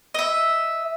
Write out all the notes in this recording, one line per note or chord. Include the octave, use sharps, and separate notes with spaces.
D#5 E5